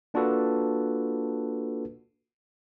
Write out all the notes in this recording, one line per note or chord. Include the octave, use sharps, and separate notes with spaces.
A#3 D4 F4 F#4 A4 B4